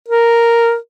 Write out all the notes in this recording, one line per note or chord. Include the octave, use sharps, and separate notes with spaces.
A#4